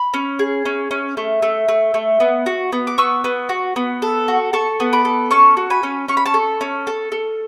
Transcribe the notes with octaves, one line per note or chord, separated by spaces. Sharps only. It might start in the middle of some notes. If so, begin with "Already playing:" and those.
Already playing: B5
C#4
G#4
C#4
C#4
A3
A3
A3
A3
B3
F#4
B3
D6
B3 C#6 E6
B3
F#4
B3
A4
F#4
A4 A5 C#6
B3
B5 D6
A4
C#4 A5 C#6
F#4
G#5 B5
C#4
C#4 C#6
B5
A5 C#6
A4
C#4
A4
A4